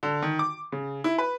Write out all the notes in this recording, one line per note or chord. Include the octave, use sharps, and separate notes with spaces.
D3
D#3
D6
C#3
E4
B4